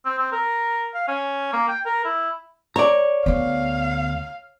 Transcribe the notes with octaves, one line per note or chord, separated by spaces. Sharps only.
C4
C4
A#4
F5
C#4
A#3
G5
A#4
E4
C#5 D5 A#5
D2 B3 F5